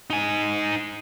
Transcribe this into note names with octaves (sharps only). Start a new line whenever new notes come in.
D#4 G#5